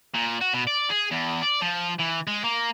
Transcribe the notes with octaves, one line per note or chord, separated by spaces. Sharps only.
A#2
F#4
B2
D5
G#4
E2
D5
F3
E3
G#3
A#3